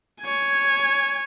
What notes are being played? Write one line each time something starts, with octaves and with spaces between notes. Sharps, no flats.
C#5 G#5